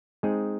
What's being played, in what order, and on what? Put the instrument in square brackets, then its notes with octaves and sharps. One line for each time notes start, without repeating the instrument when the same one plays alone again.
[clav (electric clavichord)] G#3 C4 D#4 G#4